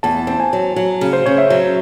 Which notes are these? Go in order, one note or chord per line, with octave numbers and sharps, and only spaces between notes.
E2 A5
C4
G#5
F#3
F#3
C#3
C5
C#3 C#5
E5
F#3